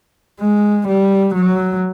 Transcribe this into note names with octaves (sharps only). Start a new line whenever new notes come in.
G#3
G3
F#3